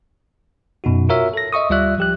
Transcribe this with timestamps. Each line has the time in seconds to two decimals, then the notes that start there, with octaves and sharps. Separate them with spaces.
0.84 F#2 B2 D#4 F#4
1.09 F4 F#4 A#4 C#5 E5
1.33 A4 A#6
1.53 D#5 E5 C#6 D#6
1.70 D2 G3 F4 D5 E5 F#6
1.98 F3 G4 F#6